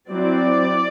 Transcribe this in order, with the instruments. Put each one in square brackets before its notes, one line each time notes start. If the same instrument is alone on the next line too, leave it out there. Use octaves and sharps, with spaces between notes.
[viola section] F#3 C4 E4 D5